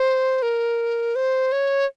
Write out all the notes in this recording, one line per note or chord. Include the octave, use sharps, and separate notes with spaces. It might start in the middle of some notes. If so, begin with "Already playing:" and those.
Already playing: C5
A#4
C5
C#5